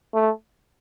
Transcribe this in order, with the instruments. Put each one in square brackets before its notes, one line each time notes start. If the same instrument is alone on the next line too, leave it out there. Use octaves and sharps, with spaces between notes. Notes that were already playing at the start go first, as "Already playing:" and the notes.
[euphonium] A3